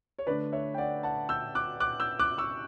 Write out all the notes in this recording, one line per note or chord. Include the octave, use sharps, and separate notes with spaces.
C#5
D3 A3 D4 B4 D5
C#5 E5
G5
D5 F#5
F#5 A5
E6 G6
D6 F#6
D6 F#6
E6 G6
D6 F#6
C#6 E6